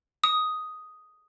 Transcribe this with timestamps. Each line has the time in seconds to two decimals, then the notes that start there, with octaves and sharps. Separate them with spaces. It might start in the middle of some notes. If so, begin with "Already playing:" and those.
0.24 D#6